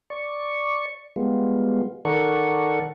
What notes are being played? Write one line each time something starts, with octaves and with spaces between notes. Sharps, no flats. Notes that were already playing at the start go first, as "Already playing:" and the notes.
D5 C#6
G3 G#3 B3 F4
D#3 A4 A#4 D5 F#5 C#6